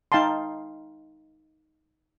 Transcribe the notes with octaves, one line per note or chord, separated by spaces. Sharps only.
D#4 F5 G5 A5 C6